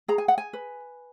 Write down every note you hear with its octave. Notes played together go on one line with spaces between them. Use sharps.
G#4 A#5
G#5
F#5
G#5
B4